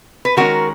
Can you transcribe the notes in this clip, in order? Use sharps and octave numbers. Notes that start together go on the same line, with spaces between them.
B4
D#3 G#3 C#4 F#4 A#4